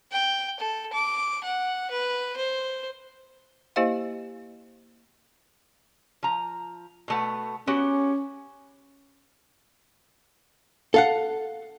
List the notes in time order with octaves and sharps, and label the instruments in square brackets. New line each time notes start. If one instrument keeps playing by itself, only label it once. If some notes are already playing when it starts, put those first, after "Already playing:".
[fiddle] G5
A4
D6
F#5
B4
C5
[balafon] A#3 E4 G4 C5 D#5 F5
[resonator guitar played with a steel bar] F3 A#5
B2 A3 B3
[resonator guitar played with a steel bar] B3 F#4 G4 [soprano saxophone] C#4
[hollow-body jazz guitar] A4 F5 F#5